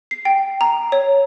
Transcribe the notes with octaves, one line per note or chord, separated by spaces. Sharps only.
C7
G5
A#5
C#5